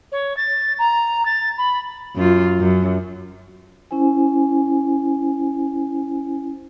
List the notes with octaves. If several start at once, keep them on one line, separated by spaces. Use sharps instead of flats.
C#5
A6
A#5
A6
B5
F#2 F4
F#2
C#4 E4 C5 G#5